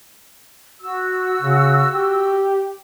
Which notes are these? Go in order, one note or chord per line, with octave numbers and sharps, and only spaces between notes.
F#4 E6
C#3
G4